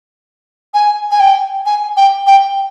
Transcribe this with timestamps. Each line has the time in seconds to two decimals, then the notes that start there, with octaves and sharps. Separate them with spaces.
0.74 G#5
1.11 G#5
1.20 G5
1.66 G#5
1.97 G5
2.27 G5